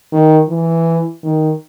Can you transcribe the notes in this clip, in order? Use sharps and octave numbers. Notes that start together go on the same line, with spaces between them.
D#3
E3
D#3